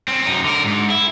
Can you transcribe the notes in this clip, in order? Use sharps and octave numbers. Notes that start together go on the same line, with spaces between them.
C4 C#4
F#2 D#4
D3 A#4
G#2
E4